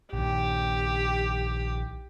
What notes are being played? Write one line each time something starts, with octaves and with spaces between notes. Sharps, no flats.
A#1 D#3 G4